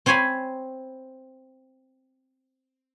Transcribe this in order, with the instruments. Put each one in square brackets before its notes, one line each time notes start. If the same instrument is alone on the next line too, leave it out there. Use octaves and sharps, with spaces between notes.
[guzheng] C4 C5 C#5 G#5 B5